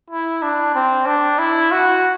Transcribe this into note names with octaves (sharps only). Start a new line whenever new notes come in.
E4
D4
C4
D4
E4
F#4